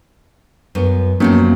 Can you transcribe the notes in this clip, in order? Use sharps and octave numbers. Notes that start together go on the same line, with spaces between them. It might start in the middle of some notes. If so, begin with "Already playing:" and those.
F#2 B3
F#2 F3 F#3 A#3 B3 C#4